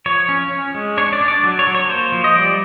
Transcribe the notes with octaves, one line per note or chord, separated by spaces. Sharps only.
F3 C#5
C#4
C#4
G#3
D4 C#5
D5
D4
D5
F#3
C#5
F#3
C#5
A#3 C5
F3
D#5
G3 D5